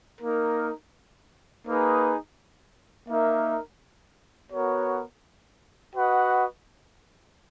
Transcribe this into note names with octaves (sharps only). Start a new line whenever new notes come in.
A#3 D#4 A#4
A#3 D#4 G#4 B4
A#3 D#4 A#4 E5
B3 F#4 A#4 C#5
F#4 B4 D#5 F#5